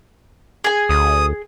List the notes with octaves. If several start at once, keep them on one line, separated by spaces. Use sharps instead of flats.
G#4 G#5
D2 D#6